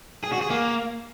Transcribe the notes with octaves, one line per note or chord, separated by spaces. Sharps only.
G#4
F#4
G#4
A#3